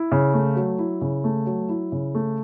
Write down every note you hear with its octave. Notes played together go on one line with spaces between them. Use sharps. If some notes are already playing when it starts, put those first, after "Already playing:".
Already playing: E4
C#3
A3
F#3
E4
C#3
A3
F#3
E4
C#3
A3